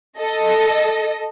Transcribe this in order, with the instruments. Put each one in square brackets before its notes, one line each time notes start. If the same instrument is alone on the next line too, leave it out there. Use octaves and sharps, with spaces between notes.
[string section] A4 D#5